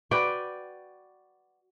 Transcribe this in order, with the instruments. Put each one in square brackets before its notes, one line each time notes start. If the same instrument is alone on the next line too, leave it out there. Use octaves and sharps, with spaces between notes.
[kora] F#4 B4 D5 G5